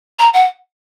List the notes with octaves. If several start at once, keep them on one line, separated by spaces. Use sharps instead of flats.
A#5
F#5